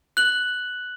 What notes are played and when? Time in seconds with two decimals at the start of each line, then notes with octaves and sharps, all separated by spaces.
0.17 F#6 F#7